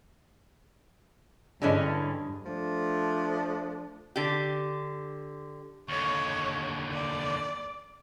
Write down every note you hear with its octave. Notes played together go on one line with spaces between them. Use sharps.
G2 D3 E3 C#4 G#4 C#5 D#5
F3 A3 D4
D3 G4
D#2 D3 C#5
D5